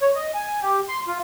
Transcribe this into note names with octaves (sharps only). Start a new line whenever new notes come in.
C#5
D#5
G#5
G4
C6
F4